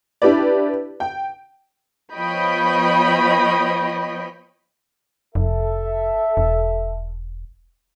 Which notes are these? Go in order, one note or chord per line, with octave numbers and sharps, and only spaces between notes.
D4 E4 G4 B4 D5
G5
F3 B3 C#5 D#5 G5 B5
F1 A4 E5
E1